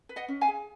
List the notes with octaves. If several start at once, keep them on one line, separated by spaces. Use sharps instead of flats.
B4
D#5 F#5
C#4
F5 G#5
G#4